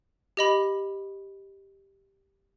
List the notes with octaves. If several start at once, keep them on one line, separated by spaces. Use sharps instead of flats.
G4 D#5 B5